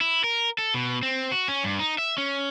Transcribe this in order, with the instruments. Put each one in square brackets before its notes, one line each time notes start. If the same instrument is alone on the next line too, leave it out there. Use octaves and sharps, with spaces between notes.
[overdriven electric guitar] E4
A#4
A4
B2
C4
F#4
C#4
G2
D#4
E5
C#4